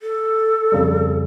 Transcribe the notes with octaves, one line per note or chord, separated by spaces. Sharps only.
A4
F2 C#3 G3